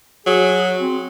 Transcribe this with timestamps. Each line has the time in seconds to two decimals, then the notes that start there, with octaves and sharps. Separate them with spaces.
0.27 F#3 G#4
0.78 C4